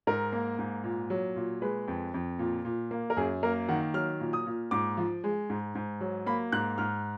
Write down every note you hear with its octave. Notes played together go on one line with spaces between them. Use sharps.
G#2 A#4
A#3
G#2
A#2
F#3
A#2
G#3 B4
F2
F2
A#2
A#2
A#3
A#4
F#2 G#4
A#3 A#4
D#3 F#5
F#3 F6
A#2
D#6
A#2
G#2 D6
F3
G#3
G#2
G#2
F#3
A#3 B5
G#2 F#6
G#2 F6